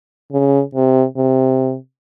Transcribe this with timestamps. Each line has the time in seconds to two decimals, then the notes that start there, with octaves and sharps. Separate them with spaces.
0.32 C#3
0.75 C3
1.17 C3